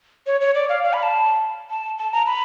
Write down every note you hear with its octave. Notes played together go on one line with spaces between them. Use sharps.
C#5
C#5
D5
F5
F5
B5
A5
A5
A5
A#5
B5